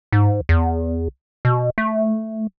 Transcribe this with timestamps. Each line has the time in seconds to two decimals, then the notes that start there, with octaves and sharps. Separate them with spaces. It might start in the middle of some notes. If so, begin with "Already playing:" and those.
0.12 G#2
0.49 E2
1.45 B2
1.78 A3